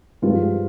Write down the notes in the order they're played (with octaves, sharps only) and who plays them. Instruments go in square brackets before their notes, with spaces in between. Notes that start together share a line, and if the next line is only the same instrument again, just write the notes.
[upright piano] G2 F3 G#3 F4